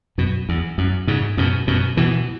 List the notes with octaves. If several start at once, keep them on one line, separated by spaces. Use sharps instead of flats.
F#2 B2
E2
F#2
G#2 C#3
F#2 B2
F#2 B2
B2 E3